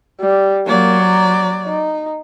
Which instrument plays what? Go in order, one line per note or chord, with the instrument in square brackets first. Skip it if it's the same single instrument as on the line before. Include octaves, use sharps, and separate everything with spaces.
[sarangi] G3
[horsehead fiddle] F#3 D5 [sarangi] A#3
[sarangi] A#5
D#4